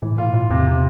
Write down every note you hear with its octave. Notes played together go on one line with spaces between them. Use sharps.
A2 E3
A#2 F4
A2 F4
E2 C3
C3